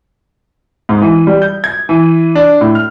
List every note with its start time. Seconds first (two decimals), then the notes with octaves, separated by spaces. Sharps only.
0.89 G#2
1.02 E3
1.27 G3
1.42 G6
1.64 G#6
1.89 E3
2.35 D4
2.61 A2
2.75 F6